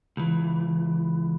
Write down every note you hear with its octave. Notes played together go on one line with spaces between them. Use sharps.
C#2 E3